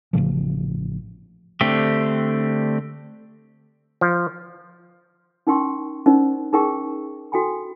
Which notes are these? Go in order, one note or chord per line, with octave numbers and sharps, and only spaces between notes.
A1 A2 C#3 F3
D3 A3 C4 D4 G4
F3
C#4 D#4 A#4 G5 C6 C#6
C#4 D#4 A#4 C5 D5
D#4 G#4 A#4 D#5 G5 C#6
F#4 A4 G5 G#5 B5